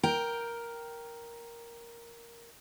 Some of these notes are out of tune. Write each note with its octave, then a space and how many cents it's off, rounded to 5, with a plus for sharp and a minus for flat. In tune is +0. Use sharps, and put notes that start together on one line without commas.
A#4 +5 G5 +0